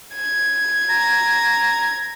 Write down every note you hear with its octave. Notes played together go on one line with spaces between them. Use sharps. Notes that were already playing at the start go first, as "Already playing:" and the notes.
G#6
A#5